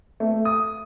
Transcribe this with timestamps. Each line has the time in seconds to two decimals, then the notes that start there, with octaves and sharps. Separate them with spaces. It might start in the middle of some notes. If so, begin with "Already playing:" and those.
0.20 A3
0.45 D#6